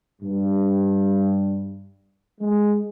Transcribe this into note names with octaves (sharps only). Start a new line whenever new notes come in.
G2
G#3